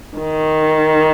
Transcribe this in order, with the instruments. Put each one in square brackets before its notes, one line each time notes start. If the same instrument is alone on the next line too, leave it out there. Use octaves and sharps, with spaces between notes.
[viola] D#3